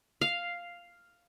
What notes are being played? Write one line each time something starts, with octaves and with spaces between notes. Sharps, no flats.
F5